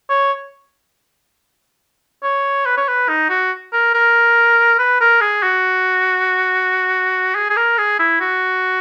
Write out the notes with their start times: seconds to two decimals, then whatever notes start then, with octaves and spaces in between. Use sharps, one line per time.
0.10 C#5
2.23 C#5
2.66 B4
2.77 C#5
2.88 B4
3.09 D#4
3.29 F#4
3.73 A#4
3.94 A#4
4.78 B4
5.01 A#4
5.21 G#4
5.43 F#4
7.35 G#4
7.50 G#4
7.57 A#4
7.78 G#4
7.99 E4
8.21 F#4